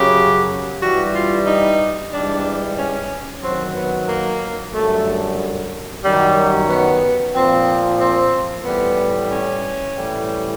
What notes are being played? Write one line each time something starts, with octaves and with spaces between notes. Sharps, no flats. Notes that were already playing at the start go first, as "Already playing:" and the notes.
Already playing: F#2 C#3 F#3 G4
G2 E3 G3 F#4
F4
D#4
G#2 E3 G3 D4
C#4
F#2 D#3 F#3 C4
B3
A#3
F#2 D3 G3 A3
F#2 D#3 F#3 G3
B3
A#2 F3 C4
C4
A2 E3 G3 B3
C#4
A2 E3 G3